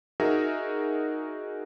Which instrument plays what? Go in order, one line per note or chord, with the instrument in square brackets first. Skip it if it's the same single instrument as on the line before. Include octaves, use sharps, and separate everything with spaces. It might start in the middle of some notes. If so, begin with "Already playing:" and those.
[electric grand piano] D#4 F#4 G#4 A#4 E5